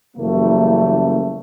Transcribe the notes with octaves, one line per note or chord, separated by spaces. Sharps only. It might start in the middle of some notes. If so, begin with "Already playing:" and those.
F#1 C#3 E3 G3 A3 A#3